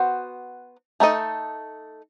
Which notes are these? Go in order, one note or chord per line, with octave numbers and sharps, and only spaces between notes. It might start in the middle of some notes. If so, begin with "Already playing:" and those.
Already playing: B3 F#4 C5
A3 D#4 A4 D#5